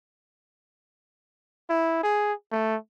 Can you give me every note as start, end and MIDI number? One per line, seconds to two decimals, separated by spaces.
1.70 2.00 64
2.03 2.33 68
2.52 2.76 57